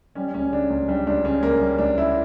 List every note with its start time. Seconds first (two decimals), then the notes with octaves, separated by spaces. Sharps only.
0.15 G3 C#4
0.34 C#2 C#4
0.52 C#3 D4
0.70 C#2
0.88 G3 D4
1.07 C#2 D4
1.24 C#3 C#4
1.43 C#2 A#3
1.60 G3
1.78 C#2 D4
1.97 C#3 E4